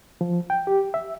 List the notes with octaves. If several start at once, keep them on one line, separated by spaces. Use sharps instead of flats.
F3
G5
G4
E5